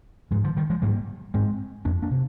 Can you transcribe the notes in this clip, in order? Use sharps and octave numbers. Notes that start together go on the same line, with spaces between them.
G#2 F3 G#3
D3 F3
D#3 G3
F3 G#3
G#2 G3 A#3
G#2 G#3 C4
F2 A#3 D4
A#3 D4
C3